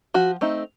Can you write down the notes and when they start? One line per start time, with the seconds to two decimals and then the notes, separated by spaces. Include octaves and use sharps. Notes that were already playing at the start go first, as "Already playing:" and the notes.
0.14 F3 F#4
0.41 A3 C4 D#4